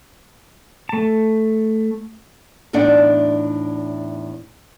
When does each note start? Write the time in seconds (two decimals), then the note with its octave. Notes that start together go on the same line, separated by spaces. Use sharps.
0.89 A3 A5
2.73 E2 A2 D4 D#4 D5 F#5